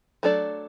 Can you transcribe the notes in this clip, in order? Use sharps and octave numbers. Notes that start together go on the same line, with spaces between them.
F#3 A3 D4 A4 D5